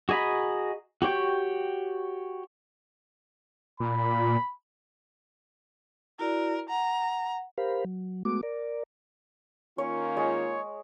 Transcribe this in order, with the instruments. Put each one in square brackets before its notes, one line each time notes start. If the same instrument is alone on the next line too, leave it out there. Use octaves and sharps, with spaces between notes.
[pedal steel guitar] F#4 G#4 D#5 A#5 B5
F#4 G4 C#5 G5
[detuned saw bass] A#2 [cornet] B5
[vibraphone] E4 F#4 D5 [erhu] A#4
[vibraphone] F#5 [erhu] A#5
[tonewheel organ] G4 A#4 C5 F5 B5
F#3
G#3 A3 B3 F#4 D6
A#4 D5
[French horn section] D#3 A#3 F4 [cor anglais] C#4 [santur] C#5
[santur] G#3 [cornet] C#5